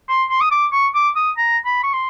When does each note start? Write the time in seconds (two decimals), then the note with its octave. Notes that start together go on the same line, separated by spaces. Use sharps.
0.09 C6
0.30 C6
0.41 D#6
0.52 D6
0.72 C#6
0.95 D6
1.16 D#6
1.37 A#5
1.65 B5
1.84 C#6
1.94 C6